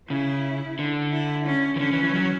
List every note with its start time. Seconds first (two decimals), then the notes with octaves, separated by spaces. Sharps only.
0.10 C#3 E4
0.79 D3
1.12 E4
1.46 C#4
1.76 E3
1.80 D3 C#4
1.92 E3
2.04 E3
2.15 F#3